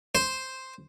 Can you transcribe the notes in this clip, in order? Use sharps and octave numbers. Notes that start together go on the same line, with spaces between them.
C5